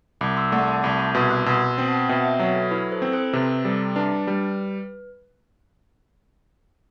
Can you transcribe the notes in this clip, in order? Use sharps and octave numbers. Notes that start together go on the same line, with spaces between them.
C2 B5 D6
C6 E6
A3 D5 F#5
D6
A5 C6
C2 B5 D6
B5 D6
B2 C6 E6
D6 F#6
B2 C6 E6
C4 G5
F#5 A5
B2 E5 G5
E5 G5
F#3 B4
A4
E4 B4
A4 C5
C4
A4 C5
C3 B4
G3 A4
D4 B4
G3